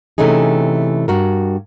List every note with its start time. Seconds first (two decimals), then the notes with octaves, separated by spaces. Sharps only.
0.18 C3 E3 A3 C#4 D#4 G#4
1.08 G2 F#4 A#4